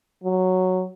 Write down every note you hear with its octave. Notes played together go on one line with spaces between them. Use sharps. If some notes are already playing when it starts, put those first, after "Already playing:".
F#3